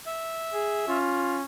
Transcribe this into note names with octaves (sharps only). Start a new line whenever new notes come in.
E5
G#4
C#4 F4